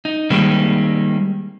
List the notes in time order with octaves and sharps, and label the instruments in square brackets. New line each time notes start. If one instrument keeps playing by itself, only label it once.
[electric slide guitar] D#4
D#3 G3 G#3 A#3 C4